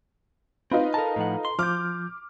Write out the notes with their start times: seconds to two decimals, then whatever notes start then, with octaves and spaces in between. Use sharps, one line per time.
0.71 C4 D#4 F4 B4
0.94 A4 A#4 A5 A#5
1.16 A2 F3 F#5
1.45 C6
1.59 F3 D6 F6 G6